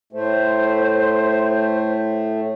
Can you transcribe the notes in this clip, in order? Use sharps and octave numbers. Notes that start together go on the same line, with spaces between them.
A2 A3 C5